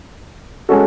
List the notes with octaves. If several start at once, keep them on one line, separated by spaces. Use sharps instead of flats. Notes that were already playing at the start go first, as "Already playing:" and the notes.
G#3 C#4 F#4 A4